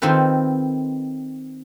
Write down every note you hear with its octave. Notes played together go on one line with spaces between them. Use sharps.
D#3 C4 F4 A4 B4